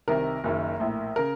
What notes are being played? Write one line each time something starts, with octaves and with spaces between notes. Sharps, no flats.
C2 C3 D#3 A#4
F#1 F#2 D#3
A#1 A2
C#3 A#4